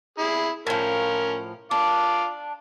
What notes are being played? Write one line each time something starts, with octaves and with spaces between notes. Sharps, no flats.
E4 G#4
A2 F3 C#4 A#4
D4 F4 D6